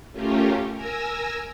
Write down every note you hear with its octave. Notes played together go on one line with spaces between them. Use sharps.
A3 C#4 F4 G4 A#4
A#4 G#5 A#5 E6